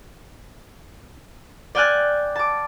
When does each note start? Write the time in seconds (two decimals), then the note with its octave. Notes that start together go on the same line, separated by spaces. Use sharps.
1.75 D5 G5 G#5 F6 F#6 A6
2.36 A5 D6